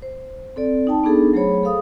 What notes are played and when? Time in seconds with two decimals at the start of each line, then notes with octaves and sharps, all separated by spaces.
0.02 C5
0.56 C4 A4 D5
0.87 D#4 G5 A5
1.04 B3 D4 D#4 G#4 A4
1.33 F#3 A3 G#4 C5 C#5 B5
1.62 G#4 A4 C5 F5 D#6